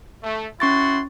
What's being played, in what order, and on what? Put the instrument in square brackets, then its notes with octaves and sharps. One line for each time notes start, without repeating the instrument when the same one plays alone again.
[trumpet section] A3
[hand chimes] C#4 C#6 A6 [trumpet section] E4 F#4 C6